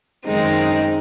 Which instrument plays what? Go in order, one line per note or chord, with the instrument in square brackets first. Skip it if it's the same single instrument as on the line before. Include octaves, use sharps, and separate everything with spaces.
[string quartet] F#2 D#3 G#3 C4 D#4